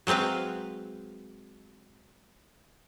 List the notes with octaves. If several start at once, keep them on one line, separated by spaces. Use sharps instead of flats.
F#3 G#3 C4 B4 F5